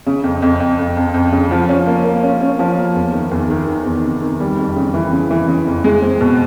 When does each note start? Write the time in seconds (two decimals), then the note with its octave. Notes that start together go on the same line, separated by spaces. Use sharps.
0.07 C#3
0.24 F2
0.42 F2
0.60 F2
0.79 F2
0.97 F2
1.14 F2
1.32 C#3
1.51 F3
1.69 C#4
1.87 A#3
2.04 A#3
2.23 C#4
2.41 C#4
2.59 F3
2.77 A#3
2.95 E2
3.13 D#3
3.31 E2
3.50 D#3
3.67 D#3
3.85 E2
4.04 C3
4.22 D#3
4.40 G3
4.58 F2
4.76 C#3
4.94 E3
5.12 C#3
5.31 E3
5.48 C#3
5.66 F2
5.84 G#3
6.02 C4
6.21 B2